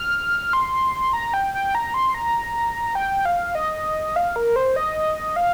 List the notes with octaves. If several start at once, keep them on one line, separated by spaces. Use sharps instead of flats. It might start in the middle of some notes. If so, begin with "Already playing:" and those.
Already playing: F6
C6
A#5
G5
G5
A#5
C6
A#5
G5
F5
D#5
F5
A#4
C5
D#5
F5